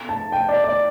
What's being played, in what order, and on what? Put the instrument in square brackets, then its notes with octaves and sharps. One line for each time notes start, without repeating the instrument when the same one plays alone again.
[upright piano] A5
G5
D5
D5